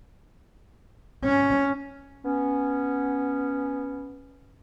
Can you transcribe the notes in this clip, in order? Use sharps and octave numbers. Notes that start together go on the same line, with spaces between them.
C#4
B3 C#4